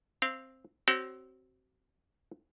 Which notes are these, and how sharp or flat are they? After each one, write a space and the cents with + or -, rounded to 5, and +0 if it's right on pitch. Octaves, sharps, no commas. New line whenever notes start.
C4 +5 F5 -20
C4 +0 F#4 +35 C#5 +0